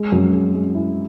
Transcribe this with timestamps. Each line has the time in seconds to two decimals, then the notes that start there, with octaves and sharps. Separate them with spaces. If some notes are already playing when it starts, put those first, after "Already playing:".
Already playing: G#3
0.12 F#2
0.33 G#3
0.54 G#3
0.75 E4